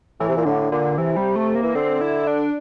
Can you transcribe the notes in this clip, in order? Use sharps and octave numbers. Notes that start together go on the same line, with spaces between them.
A2 E3
C3
A#2
A2 D3
A#2 D3
C3 E3
G3
A3
A#3
E3
D3 C4
E4
D4